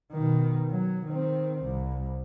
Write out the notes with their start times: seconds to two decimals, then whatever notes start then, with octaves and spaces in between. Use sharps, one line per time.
0.12 B2 D#3
0.71 F#3
1.07 D#3 C4
1.63 C2